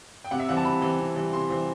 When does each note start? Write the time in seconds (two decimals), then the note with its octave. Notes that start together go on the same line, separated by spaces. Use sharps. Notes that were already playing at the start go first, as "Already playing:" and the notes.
0.24 G5
0.31 C3 F#5
0.40 E5
0.49 E3 G3 C4 F#5
0.57 A5
0.65 C3 B5
0.82 E3 G3 C4
1.00 C3
1.16 E3 G3 C4
1.33 C3 C6
1.50 E3 G3 C4